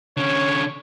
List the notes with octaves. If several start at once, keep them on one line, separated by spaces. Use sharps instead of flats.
D3 C#4 C#5